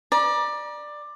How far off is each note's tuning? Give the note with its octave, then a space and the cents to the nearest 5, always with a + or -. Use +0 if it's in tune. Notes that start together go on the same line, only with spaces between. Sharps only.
D5 +15 A#5 +40